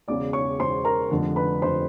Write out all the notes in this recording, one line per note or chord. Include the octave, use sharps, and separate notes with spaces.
E1 E2 C#3 D5 D6
C#5 C#6
E1 E2 C#3 C5 C6
A#4 A#5
F1 F2 D3
B4 B5
F2 D3 C5 C6